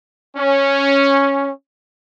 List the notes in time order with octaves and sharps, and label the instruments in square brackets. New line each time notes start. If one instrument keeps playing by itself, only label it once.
[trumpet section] C#4